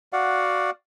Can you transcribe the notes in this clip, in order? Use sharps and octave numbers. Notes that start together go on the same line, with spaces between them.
F#4 D5 F5 F#5